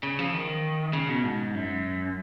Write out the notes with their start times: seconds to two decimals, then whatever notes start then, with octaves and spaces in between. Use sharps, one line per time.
0.03 C#3
0.19 F3
0.33 D#3
0.93 C#3
1.09 B2
1.24 G#2
1.54 F#2